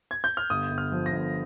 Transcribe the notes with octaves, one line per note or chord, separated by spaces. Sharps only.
G#6
G6
F6
G1 D#6
G1
F6
F3
A#6
G1